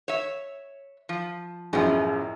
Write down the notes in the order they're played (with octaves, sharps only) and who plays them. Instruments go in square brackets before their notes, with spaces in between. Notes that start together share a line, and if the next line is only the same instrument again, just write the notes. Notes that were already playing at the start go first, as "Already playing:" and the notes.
[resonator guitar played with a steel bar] C#5 E5
F3
[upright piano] A1 F#2 [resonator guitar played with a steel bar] B2 F3 [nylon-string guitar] F4 G#4